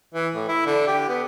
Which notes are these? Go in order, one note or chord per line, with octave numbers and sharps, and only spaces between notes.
E3
A2
E4
D3
G4
B3